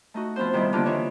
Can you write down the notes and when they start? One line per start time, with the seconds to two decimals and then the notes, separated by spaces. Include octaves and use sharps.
0.14 A3 D#4 F#4
0.36 F3 B3 C4 C5
0.53 C3 D#3 G3 B3 E4
0.73 D3 A#3 D4 F4 G4
0.85 D#3 E3 D4 E4 F4 C#5